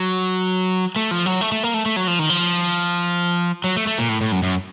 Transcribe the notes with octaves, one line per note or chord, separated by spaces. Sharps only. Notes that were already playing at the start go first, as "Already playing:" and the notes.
Already playing: F#3
A3
F3
F#3
A3
A3
A#3
A3
A3
F#3
F3
D#3
F3
F#3
A3
A3
A#2
A2
A2
F#2
F#2